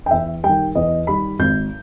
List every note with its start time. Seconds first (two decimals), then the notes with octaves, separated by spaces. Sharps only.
0.06 G5
0.11 E2 E5
0.43 D#3 G3 G5
0.75 E2 D#5
1.07 D#3 G3 B5
1.39 G#1 G6